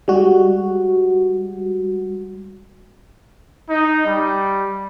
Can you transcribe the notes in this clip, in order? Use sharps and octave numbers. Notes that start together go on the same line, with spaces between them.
G3 G#3 F#4
D#4
G3